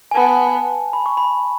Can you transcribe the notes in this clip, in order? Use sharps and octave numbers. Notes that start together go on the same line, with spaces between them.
G#5
B3 A5
B5
C#6
B5